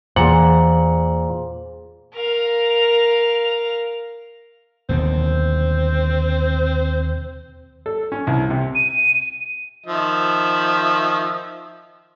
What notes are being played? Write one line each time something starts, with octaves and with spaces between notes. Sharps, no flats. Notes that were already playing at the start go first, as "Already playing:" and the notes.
E2 A#2 E3 G#4 C5 F#5
A#4 F5
D#2 B2 D3 C4
A4
C#4
C2
C3
D#7
D#3 F3 E5